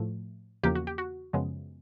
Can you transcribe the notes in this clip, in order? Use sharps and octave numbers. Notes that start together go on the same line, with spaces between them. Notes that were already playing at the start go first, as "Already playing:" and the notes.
Already playing: A2 F3 A3
E2 C#3 F3 A#3 G4
F#4
G4
F#4
F#2 C#3 F3 G#3 B3